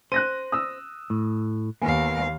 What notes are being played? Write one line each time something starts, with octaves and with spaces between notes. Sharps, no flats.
C5 F#6 A#6 D#7
D#6 E6
A2
D#2 A#3 B3 F5 G#5